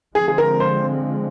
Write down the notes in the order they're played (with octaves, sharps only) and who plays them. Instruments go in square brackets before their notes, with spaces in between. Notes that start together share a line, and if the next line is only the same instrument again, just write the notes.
[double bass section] D3 F3 G#3 C4 [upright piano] G#4
[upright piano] G#4
A#4
C5